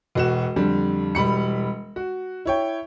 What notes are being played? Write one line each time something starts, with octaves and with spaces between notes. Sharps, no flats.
E1 F#4 E7
F2 D3 G3
E1 G3 B5 C#7
F#4
E4 C#5 G5